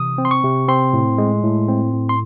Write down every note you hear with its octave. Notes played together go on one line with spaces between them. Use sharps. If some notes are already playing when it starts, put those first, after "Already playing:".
Already playing: C3 E3 D#6
C4
C6
C#6
C3
C4 C6
A2
G#3
A2
C4
A2
C6